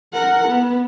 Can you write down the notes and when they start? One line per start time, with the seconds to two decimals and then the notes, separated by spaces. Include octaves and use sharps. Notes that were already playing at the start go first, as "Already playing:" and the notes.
0.13 A#4 F#5
0.48 B3